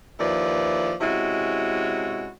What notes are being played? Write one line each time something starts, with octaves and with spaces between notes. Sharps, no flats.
D#2 F3 E4 B4 D5
C3 G#3 C#4 E4 F#4